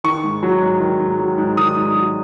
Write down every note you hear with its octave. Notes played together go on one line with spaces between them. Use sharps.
D#3 C#6
G#2
F#3
G#2
D#3
G#2
F#3
G#2
D#3 D#6
G#2
F#3